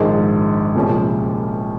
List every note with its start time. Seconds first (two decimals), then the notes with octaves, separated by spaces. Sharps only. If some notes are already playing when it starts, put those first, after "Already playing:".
Already playing: A#1 G#2 D#3 G#3
0.75 C2 A#2 F3 G#3 C#4